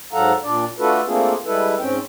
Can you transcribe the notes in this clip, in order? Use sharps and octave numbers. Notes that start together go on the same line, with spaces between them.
G#2 F#3 A4 F5 F#5 A#5
A#2 D4 D5
A3 D4 F4 F#4 A4 B4
A3 A#3 C4 D4 F4 G#4
G3 G#3 E4 A4 B4
G#2 C4 C#4 G5